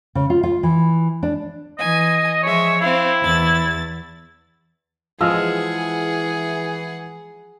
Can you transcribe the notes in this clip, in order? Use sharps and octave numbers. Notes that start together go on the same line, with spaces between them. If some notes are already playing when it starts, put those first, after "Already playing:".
C#3
F4
F4
E3
D4
E3 D#5 G#5
F3 G#3 C#5 E5
C4 E4 F5
E2 A6
E3 F3 G#3 G#4 D#5 F#5 E6 F6